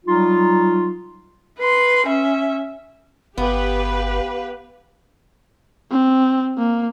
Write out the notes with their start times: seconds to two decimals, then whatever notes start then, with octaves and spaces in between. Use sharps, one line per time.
0.05 F#3 G3 D#4 F4
1.59 B4 C6
2.06 C#4 E5
3.38 G1 B3 G4 B4 F5
5.91 C4
6.58 A#3